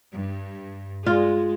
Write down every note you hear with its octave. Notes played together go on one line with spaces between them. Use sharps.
G2
G#3 F4